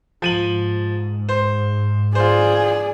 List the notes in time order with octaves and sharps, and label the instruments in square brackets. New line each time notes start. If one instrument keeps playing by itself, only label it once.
[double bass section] G#2 [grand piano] F3 D#7 F#7
[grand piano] C5
[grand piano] F4 C5 [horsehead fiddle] G#4 [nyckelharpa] D5